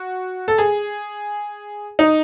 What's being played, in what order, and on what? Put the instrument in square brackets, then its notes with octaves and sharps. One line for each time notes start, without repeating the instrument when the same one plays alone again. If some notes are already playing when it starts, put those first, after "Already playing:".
Already playing: [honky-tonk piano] F#4
A4
G#4
D#4